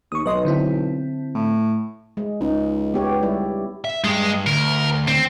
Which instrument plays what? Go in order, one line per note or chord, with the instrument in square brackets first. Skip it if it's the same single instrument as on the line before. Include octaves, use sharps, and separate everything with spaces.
[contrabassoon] D#2 [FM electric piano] C#6 D#6
[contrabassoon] B1 [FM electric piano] B4 D#5 C6
[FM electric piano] D3 C4 E4
[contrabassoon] A2
[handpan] G#3
[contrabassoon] C#2 [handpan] D#4
[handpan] B3 G4 C#5
G3 E4 D5
[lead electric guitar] E5
[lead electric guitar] G2 [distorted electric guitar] G#3
[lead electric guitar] D2 [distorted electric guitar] A#4
[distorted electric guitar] C4